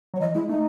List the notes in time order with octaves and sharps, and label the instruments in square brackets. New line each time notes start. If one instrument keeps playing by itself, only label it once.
[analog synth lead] F#3 [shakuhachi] C#5
[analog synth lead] E3 [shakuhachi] D#5
[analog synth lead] G#3 [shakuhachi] E4
[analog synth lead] A3 [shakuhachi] D#4